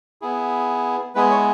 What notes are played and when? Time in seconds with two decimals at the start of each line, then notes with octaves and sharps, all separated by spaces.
0.22 B3 E4 G#4
1.15 G#3 B3 E4 G#4 B4
1.31 C#5